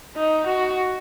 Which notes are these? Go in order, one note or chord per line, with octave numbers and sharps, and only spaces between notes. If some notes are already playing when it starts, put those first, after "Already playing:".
D#4
F#4